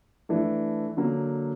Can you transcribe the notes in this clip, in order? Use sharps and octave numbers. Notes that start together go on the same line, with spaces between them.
E3 A3 D4
D3 F#3 A#3